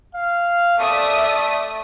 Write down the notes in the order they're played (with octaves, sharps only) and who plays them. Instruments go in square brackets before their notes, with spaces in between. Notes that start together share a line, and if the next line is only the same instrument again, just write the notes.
[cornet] F5
[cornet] A3 [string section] D5 E5 D#6